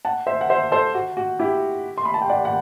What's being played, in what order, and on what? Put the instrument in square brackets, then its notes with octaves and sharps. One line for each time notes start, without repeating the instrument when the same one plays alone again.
[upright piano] F#5 A5
C5 E5
F#5
C5 E5
A4 C5
F#4
F#4
E4 G4
C6
B5
A5
G5
D5 F#5
F#5